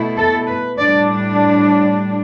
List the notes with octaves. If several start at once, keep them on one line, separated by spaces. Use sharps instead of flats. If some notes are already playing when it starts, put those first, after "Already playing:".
Already playing: B2 A3 E4
A4
B4
A2 G3 D4 D5